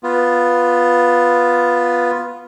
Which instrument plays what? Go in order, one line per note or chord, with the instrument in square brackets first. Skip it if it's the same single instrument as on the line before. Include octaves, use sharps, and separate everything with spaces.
[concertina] B3 F4